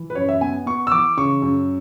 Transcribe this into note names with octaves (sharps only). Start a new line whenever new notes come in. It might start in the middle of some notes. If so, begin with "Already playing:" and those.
Already playing: E3
B4
F#2 C#5
E5
B3 G#5
B3 C#6
E6
E3 D6
C#3 C#6
F#2